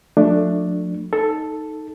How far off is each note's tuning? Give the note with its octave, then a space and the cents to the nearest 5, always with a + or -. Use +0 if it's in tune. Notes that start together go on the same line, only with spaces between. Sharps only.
F3 +40 A3 +10 D4 +10
D#4 +0 A4 +0